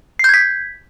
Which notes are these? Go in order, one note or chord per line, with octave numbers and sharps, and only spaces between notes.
G6 G#6 B6 C7